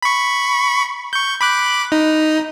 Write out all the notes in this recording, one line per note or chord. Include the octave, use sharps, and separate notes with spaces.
B5 C#6
C#6 G6
B5 D6 F#6
D#4